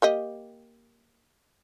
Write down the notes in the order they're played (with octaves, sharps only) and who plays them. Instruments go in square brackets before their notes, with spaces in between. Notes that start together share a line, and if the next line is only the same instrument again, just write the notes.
[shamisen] A#3 G4 D#5